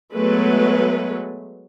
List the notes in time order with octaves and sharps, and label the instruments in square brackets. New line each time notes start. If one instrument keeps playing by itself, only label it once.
[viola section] F#3 G#3 A3 B3 B4